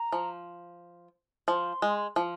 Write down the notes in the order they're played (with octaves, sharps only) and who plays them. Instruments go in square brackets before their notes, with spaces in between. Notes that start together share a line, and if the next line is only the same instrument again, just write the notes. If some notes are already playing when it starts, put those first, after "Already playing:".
Already playing: [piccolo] A#5
[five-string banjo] F3
[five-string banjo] F3 [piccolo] C6
[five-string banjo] G#3
F3